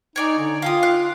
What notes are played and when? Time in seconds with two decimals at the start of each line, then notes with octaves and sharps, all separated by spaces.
0.16 D#4 C#5 D5 G#5
0.39 D3
0.62 F4 F5 G5 D#6
0.83 F5 F#6